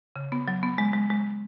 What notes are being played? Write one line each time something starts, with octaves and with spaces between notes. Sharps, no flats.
C#3
B3
F#3
B3
G#3
G#3
G#3